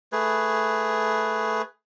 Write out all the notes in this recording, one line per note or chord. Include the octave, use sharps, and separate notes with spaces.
A3 G#4 B4